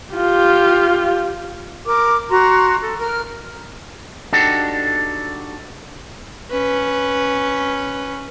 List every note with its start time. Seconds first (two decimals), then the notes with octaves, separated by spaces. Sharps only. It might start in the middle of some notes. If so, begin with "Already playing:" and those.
0.13 F4 G4
1.86 A#4 D6
2.31 F#4 A#5 C6
2.82 A4
3.00 A#4 F6
4.33 D4 D#4 F#4 G4 A4
6.50 C#4 B4